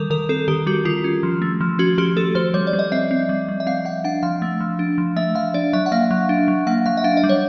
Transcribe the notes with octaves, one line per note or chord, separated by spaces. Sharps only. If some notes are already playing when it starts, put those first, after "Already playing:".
Already playing: D#3 G3 A4 A#4
D#3 A#4
C4 A4
D#3 G4
G3 F#4
D#3 F4
C#4
F3
A3
F3
C#4 F#4
F3 G4
A3 A4
F3 C5
G3 C#5
D5
G3
D#5
C4 E5
C4
G3
G3
E5
C4 F5
C4 F#5
D4 F#5
F3 F5
A3
F3
D4
F3
A3 E5
F3 F5
D4 D5
F#3 E5
F#5
A#3 F5
F#3
D4
F#3
A#3 F#5
F#3 F5
E5
D4 F5
D#5
G3
C#5